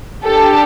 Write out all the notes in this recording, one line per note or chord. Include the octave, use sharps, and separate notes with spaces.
D4 G4 A4